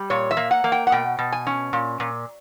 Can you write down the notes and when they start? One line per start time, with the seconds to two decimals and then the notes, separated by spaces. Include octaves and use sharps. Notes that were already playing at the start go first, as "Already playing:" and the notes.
Already playing: G3
0.10 A#2 C#5
0.31 E5
0.37 A#3
0.51 F#5
0.64 A#3
0.72 G5
0.87 F#5
0.92 B2 G5
1.19 B2
1.32 G#5
1.47 C#4
1.73 A#2
2.00 A#2